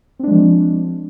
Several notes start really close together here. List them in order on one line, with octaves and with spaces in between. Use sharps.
C4 D4 G#3 F3